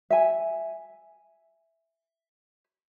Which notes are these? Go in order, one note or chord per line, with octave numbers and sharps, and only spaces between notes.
E5 G#5